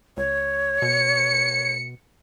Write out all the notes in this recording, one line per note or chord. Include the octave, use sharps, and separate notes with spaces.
C#2 C#5
B2 C#7